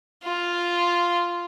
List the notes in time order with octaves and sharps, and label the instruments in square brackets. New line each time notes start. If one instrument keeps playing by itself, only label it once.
[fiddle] F4